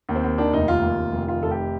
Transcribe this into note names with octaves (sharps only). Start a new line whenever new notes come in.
D#2
C4
D#2
D#3 D4
F1 D#4
D#2 F4
D#2
F1
F1
D#3 F4
F1 A4
G4